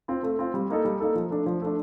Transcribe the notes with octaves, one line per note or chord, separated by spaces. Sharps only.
C4 F4
A3
C4 F4
G3
A#3 D#4 A4
G3
A#3 D#4 A4
F3
A3 D4
F3
A3 D4